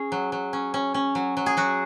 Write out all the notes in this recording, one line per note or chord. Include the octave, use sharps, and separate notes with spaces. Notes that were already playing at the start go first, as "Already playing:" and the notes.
Already playing: C#4 G#4
F#3
F#3
C#4
C#4
C#4
F#3
F#3
G#4
F#3 F#4